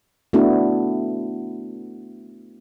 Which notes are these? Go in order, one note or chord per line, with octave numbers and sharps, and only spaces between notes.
A3 B3 D4 E4 F#4